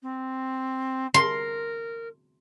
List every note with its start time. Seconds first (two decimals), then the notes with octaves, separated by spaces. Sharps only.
0.02 C4
1.14 A#4 C6